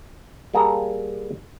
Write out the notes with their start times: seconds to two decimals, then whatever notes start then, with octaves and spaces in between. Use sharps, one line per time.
0.54 G3 A#3 G#4 A4 A#5